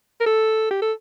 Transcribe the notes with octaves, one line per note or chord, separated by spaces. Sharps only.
A#4
A4
G4
A4